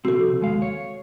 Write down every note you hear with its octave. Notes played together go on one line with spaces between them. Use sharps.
C3 F3 C4 F#4 A4
D#2 G#3 F5
C#5